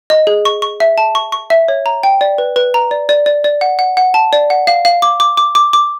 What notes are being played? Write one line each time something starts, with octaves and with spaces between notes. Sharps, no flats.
D#5
G#4
C#6
C#6
E5
A5
C#6
C#6
E5
C#5
A#5
G5
D5
B4
B4
A#5
D5
D5
D5
D5
F#5
F#5
F#5
A5
D5
F#5
F5
F5
D6
D6
D6
D6
D6